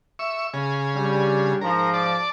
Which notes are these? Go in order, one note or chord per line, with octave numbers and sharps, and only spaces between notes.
E5 C#6
C#3 G#4
G3 D4
G#2 F3 A#4
D5 A5